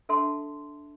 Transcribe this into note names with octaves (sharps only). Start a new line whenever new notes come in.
D4 A4 E5 F#5 A5 C6